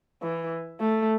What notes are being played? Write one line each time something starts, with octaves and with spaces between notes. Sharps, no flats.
E3
A3